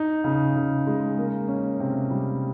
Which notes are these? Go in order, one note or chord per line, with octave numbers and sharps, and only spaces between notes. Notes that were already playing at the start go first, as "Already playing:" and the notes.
Already playing: D#4
C#3
C#3
G#3
A#3
C#4
C3
G3